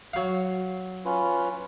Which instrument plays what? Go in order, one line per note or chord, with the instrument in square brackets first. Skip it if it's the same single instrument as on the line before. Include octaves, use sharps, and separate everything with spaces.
[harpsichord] F#3 F5
[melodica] C#4 F4 B4